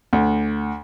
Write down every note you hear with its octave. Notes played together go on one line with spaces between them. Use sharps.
D2